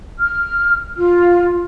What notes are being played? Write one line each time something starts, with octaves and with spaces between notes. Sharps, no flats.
F6
F4